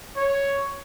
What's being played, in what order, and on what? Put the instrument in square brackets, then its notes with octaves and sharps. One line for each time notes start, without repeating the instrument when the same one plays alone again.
[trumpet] C#5